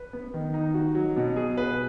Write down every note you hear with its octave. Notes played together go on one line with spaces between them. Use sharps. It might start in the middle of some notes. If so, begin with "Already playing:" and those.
Already playing: B4
B3
D#3
D#4
F#4
F#3
B2
G#4
B4